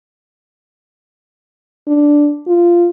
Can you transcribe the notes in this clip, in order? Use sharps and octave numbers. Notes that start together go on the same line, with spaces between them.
D4
F4